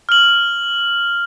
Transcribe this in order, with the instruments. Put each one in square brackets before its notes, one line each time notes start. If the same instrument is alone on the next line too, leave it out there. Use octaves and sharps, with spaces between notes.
[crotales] F6 F#7